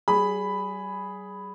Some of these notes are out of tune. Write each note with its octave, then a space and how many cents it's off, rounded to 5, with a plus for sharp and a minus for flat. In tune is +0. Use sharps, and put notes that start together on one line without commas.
G3 -40 G#4 +0 B5 +0